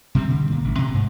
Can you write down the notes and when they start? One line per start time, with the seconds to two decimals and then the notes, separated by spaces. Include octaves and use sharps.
0.15 C3 G3 C4
0.30 D3
0.51 A#2
0.64 A1
0.79 C3
0.94 G#2